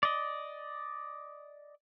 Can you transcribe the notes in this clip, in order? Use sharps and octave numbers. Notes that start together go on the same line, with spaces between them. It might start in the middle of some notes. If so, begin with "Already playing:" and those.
D5 D#5